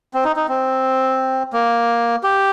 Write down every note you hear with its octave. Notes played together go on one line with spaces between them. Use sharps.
C4
D#4
D#4
C4
A#3
G4